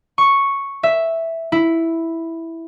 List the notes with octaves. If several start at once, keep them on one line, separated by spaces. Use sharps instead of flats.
C#6
E5
E4